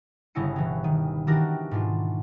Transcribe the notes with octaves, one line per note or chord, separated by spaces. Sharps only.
G1 C#3 C#4 E4 D#5 C#7
B2 E3 C#4
D#3 D#7
D#3 E3 D4 F#4 G4 A#4
G#2 B2 D4 F4